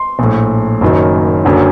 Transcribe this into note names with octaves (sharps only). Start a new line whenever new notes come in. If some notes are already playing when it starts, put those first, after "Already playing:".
Already playing: C6
A#1 A2
F#1 F#2 D#3
F#1 F#2 D3